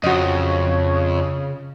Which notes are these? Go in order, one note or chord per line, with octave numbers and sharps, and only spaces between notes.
F2 C#3 F#4 C#5 D#5